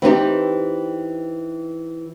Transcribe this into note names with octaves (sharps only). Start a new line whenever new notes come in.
E3 C4 D#4 G4